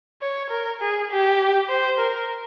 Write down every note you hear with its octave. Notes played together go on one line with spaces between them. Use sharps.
C#5
A#4
G#4
G4
C5
A#4